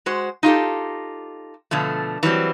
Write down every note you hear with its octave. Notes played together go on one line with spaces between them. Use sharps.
G#3 F#4 C5
D#4 F4 G4 A4
B2 D3 F3 A3
E3 F#3 G3 C4